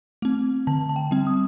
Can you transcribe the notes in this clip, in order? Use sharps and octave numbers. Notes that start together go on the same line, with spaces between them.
A3 C4
D3 A5
A5
G5
G3 C4
D#6